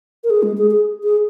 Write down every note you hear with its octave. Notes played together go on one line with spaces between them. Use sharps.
A#4
G#4
G#3
G#4
G#4
G#4